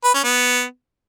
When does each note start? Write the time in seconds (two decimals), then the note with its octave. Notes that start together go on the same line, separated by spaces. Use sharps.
0.04 B4
0.14 C#4
0.24 B3